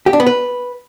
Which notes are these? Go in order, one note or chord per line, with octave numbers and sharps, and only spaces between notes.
G4
D4
B3
B4